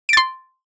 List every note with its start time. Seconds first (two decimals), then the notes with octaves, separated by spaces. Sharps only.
0.09 D7
0.13 A6
0.17 C6